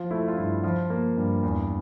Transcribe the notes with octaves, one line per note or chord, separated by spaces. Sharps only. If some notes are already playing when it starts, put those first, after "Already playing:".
Already playing: F3 F4
A3 E4
F4
G2 E4
F3 F4
A#3
G2
E2